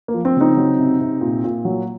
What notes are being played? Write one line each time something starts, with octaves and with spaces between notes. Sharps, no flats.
A#3
F3
C4
C#3 C4 D#4
F#3
C3
C3
A#2
A#2
F#3